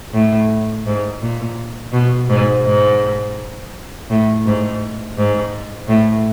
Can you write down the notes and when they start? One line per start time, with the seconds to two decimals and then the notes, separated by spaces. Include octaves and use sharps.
0.13 A2
0.86 G#2
1.21 A#2
1.93 B2
2.29 G#2
2.65 G#2
4.10 A2
4.46 G#2
5.17 G#2
5.88 A2